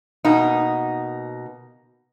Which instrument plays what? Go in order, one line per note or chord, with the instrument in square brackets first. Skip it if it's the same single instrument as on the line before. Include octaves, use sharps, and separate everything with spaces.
[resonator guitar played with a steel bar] B2 A#3 D#4